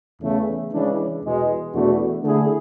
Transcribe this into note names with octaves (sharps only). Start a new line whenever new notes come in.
E2 C#3 E3 A3
C#3 E3 G#3 D4
E2 B2 G#3
E2 B2 A3 D4 F#4
D3 A3 E4 G#4